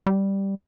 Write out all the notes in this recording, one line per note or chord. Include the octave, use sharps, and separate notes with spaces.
G3